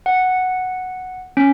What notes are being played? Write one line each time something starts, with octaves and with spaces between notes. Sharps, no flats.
F#5
C#4